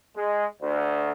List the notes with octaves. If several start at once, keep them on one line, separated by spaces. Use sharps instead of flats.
G#3
D2